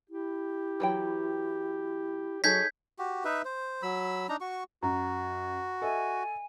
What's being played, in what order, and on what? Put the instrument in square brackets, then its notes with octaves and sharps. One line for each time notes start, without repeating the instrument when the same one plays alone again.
[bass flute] E4 [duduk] G4
[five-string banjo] E3 F#3 G5
[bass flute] F#3 [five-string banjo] D#4 G#4 A4 [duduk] C#5 [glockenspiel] G6 G#6 B6
[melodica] F#4 G4
D#4 B4 E5
C5
F#3 B5 E6
D4 D#4 A#5
F#4 C#6
[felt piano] F#2 [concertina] F#4 [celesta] A#5
[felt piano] A4 D#5 E5 [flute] G#5